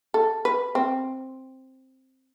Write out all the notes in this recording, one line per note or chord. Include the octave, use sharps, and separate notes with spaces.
A4
B4
C4